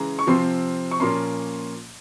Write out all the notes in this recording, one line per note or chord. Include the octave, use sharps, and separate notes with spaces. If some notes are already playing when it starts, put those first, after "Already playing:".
Already playing: C#3 E3 G#3 A#5
C#6
C3 F3 C4 C6
C#6
A#2 F3 A#3 C#4 C6